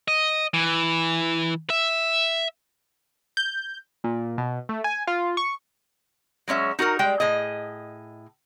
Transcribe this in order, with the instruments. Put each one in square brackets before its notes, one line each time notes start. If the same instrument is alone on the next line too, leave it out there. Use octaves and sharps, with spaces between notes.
[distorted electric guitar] D#5
E3
E5
[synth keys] G6
A#2
B2
A3
G#5
F4
C#6
[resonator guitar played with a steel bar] F#3 G#3 C#4 E5
D#4 F#4 A4 A#4
G3 G#3 G5
A2 G#4 D#5